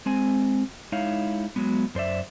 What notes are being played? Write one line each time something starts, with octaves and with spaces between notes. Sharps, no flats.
G#3 C4 G#5
G#3 D#4 E4 C#5 F5
F#3 G#3 B3
F#2 C5 D5 E5